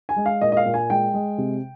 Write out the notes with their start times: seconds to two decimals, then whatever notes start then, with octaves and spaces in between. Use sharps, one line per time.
0.09 G#5
0.16 G#3
0.26 F5
0.41 A#2 D#5
0.52 D#5
0.57 F5
0.66 A#2
0.74 G#5
0.90 G#3 G5
1.14 G#3
1.38 C3